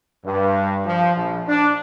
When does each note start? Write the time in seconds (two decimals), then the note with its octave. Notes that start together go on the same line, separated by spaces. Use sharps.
0.24 G2
0.85 F3
1.16 A#1
1.48 D4